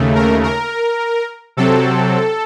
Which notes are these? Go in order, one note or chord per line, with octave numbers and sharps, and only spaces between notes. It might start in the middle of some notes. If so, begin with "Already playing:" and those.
Already playing: D#2 C#3 A3
A#4
A#4
C3 F#3 C4 A4